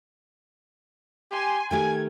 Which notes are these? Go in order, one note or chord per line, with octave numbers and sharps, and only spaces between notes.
G4 G#5 C6
D#3 A3 G4 G#5 G#6